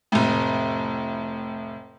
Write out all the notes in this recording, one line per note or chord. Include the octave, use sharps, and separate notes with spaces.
F1 A2